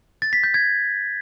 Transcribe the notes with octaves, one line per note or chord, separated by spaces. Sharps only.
A6
B6
G6
G#6